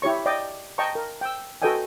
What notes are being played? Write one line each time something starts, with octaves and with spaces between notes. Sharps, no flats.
E4 G4 C#5 C#6
D5 D#5 G5 D6
D#5 G5 A5 A#5 C#6
A#4
G5 E6
F#4 A4 B4 D#5 G5 G#5